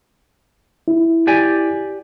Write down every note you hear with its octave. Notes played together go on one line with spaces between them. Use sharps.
E4
G4 D5 G#5